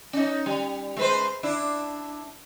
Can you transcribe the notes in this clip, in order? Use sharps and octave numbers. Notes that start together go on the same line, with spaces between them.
C#4 D#4
G3
G#3 B4 C5
D4 E4